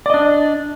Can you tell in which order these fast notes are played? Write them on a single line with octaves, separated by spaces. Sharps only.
D5 D#5 D4